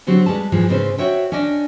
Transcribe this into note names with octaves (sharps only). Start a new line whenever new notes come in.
D3 F#3 C4 F#4 G4
G3 G#3 B4 A5
G#2 E3 F3 G4
G#2 C#3 C4 B4 C5
F#4 C5 C#5 E5 F#5 G5
C#4 D4 D5 D#5 G5